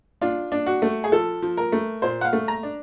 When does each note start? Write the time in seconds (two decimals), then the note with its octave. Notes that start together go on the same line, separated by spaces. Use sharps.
0.22 D4 F4
0.52 D4
0.66 F#4
0.82 A3
1.04 G#4
1.12 F3 A4
1.42 F3
1.57 A#4
1.72 A3
2.02 A#2 C5
2.21 F#5
2.25 F5
2.33 A3
2.48 A#5
2.63 D4